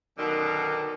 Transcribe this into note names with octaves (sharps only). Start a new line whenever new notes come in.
F#2 B2 D3 D#3